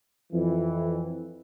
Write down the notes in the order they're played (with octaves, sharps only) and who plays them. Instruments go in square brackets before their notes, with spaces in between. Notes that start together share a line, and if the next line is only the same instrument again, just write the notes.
[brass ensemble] F2 E3